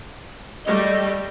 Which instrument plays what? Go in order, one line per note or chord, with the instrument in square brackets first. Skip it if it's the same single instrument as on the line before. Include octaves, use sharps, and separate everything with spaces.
[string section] G3 A3 [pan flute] D#5